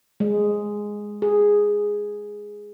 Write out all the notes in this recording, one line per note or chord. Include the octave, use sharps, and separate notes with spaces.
G#3
G#4